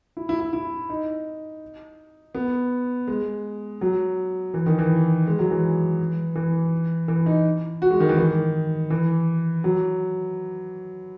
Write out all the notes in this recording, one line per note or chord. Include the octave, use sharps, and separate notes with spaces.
E4
E4
E4
E4
D#4
B3
G#3
F#3
E3
D#3
E3
G#3
F#3
E3
E3
E3
D#4
F#4
G#3
D#3
E3
D#3
E3
F#3